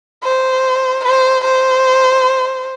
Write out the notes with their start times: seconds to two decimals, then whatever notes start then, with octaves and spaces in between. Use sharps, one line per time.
0.24 C5
1.05 C5
1.45 C5